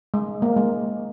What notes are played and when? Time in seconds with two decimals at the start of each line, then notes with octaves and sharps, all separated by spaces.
0.14 G#3
0.42 A#3
0.57 G#3